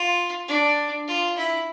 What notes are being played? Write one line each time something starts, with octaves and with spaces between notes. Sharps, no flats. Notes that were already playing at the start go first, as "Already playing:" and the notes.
Already playing: F4
D4
F4
E4